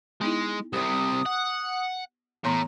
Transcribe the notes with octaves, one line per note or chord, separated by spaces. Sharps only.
G#3 B3 D#4 E4
C2 C3 G4 C5 D#6
F#5
A2 E3 B3 A#5 C6